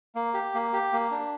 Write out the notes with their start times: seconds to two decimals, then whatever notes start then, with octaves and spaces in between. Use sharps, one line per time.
0.15 A#3
0.34 G4
0.54 A#3
0.73 G4
0.93 A#3
1.11 D4